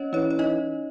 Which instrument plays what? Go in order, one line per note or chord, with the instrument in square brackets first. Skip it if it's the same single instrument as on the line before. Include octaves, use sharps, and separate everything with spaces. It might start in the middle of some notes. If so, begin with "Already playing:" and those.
Already playing: [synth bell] C#4 C#5 D#5
[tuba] E3 [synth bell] C#4 C#5
[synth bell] C#5
D#4 D#5